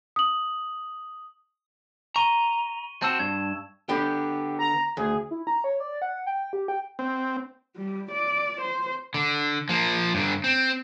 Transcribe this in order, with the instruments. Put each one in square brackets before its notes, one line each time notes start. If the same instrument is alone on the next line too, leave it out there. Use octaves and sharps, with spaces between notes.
[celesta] D#6 F#7
[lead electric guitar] A#5 [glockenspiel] C#6 D#7 G7
[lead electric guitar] C4 F#4 [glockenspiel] A5 E6 E7
[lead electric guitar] G2 [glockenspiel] G#6
[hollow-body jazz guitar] D3 B3 G5 [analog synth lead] G4
[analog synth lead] A#5
[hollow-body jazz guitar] D2 [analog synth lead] G#4
[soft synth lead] E4
A#5
C#5
D5
F#5
G5
G4
G5
[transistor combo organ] C4
[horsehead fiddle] G3
D5
C5
[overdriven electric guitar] D3
F3 A#3
G2 D3
C4